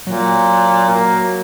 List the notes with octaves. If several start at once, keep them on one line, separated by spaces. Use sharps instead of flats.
A#2 F#3
A#3